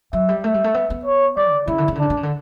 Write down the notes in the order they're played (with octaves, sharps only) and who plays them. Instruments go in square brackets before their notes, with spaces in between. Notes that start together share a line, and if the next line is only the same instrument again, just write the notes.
[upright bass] F#3 [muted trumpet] E5
[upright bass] G3
[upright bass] A3 [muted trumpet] E5
[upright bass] G3
A3
B3
B3
[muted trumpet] C#5
[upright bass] G3 [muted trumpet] D5
[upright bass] C#3
[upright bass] C#3 [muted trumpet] E4
[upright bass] D3
C#3
D3
[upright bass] C#3 [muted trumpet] D4
[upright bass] D3
C#3
D3